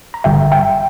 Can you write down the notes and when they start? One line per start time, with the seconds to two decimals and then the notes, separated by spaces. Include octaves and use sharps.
0.14 A#5
0.24 G1 G2 D3 G3 E5 G5
0.52 E5 G5